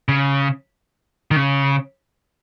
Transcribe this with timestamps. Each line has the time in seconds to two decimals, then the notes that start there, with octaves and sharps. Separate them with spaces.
0.08 C#3
1.31 D#3
1.36 C#3